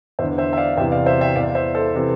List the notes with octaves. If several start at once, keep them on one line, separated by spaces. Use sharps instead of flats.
E2 D3 C5 E5
C5 E5
E5
D5 F5
E2 C3 E3 E5 G5
D5 F5
C5 E5
E5 G5
E2 E3 D5 F5
C5 E5
A4 C5
C3 E3